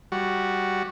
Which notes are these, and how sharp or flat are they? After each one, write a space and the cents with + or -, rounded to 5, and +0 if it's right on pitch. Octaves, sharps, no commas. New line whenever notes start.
G3 +0 F#4 +0